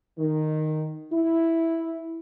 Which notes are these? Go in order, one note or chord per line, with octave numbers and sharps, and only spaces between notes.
D#3
E4